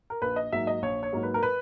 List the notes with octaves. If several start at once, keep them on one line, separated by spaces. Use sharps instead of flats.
A#4
A#1 B4
D#5
G#2 F#3 A#3 E5
D#5
A#1 C#5
C#5
G#2 F#3 A#3
B4
A#4
B4